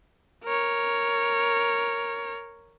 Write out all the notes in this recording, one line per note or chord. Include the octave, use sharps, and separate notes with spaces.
A#4 C#5